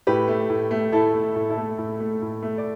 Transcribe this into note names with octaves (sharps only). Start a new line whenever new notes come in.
A2 G4 B4
A3
A2
A3
A2 E4 A4
A3
A2
E4 A4
A3
A2
A3
A2
A3
D5